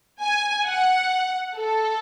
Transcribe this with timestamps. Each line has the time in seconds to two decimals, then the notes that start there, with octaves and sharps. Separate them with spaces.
0.21 G#5
0.66 F#5
1.56 A4